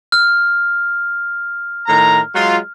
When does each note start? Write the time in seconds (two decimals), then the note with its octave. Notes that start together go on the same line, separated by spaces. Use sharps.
0.12 F6
1.87 A2 D#3 A#5
2.34 F#3 G#3 F4